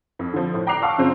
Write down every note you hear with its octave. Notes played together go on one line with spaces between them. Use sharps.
F2
D3 F3
A2
G5 A#5 D6 F#6 C7 F7
F5 A5 C#6 D6 E6
F#2 C#3 C4 F4